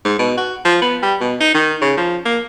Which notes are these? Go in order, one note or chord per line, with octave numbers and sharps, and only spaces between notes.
G#2
B2
F#4
F3
B3
G3
B2
D#4
D#3
C#3
F3
A#3